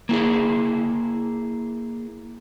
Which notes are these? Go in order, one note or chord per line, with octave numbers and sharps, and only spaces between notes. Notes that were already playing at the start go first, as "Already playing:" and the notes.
A#3 E4 G#4